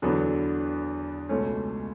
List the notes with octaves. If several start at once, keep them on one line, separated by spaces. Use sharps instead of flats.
E2 D3 F#3 B3 D4
C#2 B2 A3 C#4